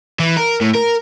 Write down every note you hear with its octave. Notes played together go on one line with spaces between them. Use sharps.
E3
A#4
A2
A#4